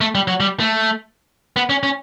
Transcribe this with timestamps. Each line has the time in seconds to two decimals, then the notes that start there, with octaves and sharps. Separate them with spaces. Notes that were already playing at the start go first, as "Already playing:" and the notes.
0.01 A3
0.15 G3
0.28 F#3
0.40 G3
0.60 A3
1.56 B3
1.70 C#4
1.83 C#4